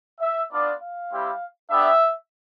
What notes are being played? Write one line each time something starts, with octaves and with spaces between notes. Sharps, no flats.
E5
B3 D4 F4 D5
F5
G3 C4 E4 G4
B3 D4 G4 E5